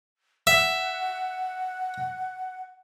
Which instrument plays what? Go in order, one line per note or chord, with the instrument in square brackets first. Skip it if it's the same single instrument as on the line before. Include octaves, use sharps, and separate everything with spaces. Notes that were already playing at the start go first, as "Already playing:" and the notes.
[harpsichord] E5 [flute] F#5